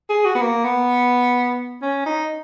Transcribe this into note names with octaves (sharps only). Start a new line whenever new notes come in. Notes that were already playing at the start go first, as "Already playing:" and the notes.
G#4
F#4
B3
A#3
B3
C#4
D#4